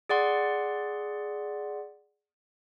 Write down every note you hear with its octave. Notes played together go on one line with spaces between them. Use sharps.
G#4 D5 F#5 C6